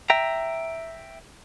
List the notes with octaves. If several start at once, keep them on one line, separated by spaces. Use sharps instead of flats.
E5 G5 A#5